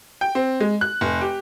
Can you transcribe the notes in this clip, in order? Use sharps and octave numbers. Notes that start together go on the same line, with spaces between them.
G5
C4
G#3
F#6
F1
G4